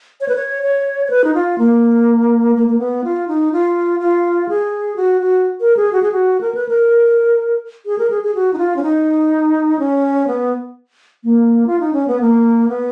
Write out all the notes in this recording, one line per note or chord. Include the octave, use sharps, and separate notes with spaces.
C#5
B4
C#5
C#5
C#5
B4
D#4
F4
A#3
A#3
A#3
B3
F4
D#4
F4
F4
G#4
F#4
F#4
A#4
G#4
F#4
G#4
F#4
A#4
B4
A#4
G#4
A#4
G#4
G#4
F#4
D#4
F4
C#4
D#4
C#4
B3
A#3
F4
D#4
C#4
B3
A#3
B3